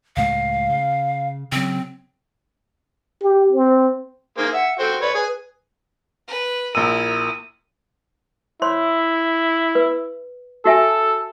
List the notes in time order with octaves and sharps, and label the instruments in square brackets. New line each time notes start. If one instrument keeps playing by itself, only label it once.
[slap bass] C#2 A2 G#3 [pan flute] F5
[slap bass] C#3
[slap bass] C#3 F#3 [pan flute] C4
[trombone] G4
C4
[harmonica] A#3 G#4 C5 [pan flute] D#4
[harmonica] E5 [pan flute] F#5
[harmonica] F#4 C5 G5 [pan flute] A4
[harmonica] B4 C#5 [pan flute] D5
[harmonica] G#4 G#5 [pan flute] B4
[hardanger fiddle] B4
[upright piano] A#1 E6 [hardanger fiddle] E4 A#4 [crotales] D#7
[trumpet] E4 [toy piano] C5 C#5 C6
[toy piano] B4
[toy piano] F#4 E5 G#5 [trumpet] A4